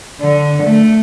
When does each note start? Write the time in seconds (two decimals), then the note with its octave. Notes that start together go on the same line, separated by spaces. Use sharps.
0.21 D3
0.64 A3